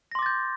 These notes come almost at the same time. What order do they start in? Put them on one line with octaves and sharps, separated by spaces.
A#6 C6 D6 A6 G6